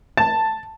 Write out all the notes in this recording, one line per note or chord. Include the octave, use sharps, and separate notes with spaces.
A5